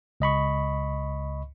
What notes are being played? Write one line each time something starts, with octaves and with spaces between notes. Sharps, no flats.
C#2 D#5 B5 C#6